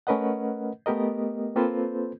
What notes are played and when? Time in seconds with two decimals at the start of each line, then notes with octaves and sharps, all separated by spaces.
0.07 A3 C#4 A#4 B4 D#5 F#5
0.86 A3 B3 G4 A#4 D#5
1.56 A#3 C4 F4 A4 B4 C5